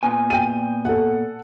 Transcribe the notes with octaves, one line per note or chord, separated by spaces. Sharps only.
A#2 B3 G#5
G5 D#7
A4 F#5